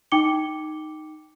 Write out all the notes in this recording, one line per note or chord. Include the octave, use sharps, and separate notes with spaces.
D#4 G5 D6 C#7 G7